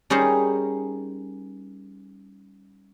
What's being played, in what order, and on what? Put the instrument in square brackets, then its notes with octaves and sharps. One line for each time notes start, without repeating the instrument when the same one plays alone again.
[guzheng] G3 C#4 D#4 G#4 A#4 C5